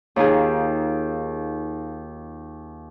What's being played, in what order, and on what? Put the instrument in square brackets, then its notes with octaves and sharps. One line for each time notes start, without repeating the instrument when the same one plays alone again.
[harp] D#2 D#4 F4 G#4